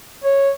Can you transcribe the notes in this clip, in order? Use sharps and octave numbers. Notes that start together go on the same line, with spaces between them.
C#5